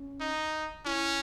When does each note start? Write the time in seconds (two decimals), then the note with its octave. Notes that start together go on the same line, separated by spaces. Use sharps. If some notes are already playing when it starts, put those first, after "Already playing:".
Already playing: C#4
0.21 D#4
0.86 C#4 E4